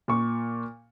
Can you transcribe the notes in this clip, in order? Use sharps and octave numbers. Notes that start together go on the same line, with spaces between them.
A#2 C#6